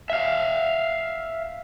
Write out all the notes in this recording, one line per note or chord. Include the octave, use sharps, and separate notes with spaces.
E5 F5